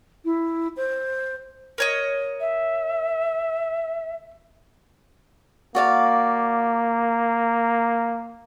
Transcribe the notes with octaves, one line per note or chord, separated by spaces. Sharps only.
E4
C5
A#4 C#5 D#5
E5
A#3 F#4 D5 F5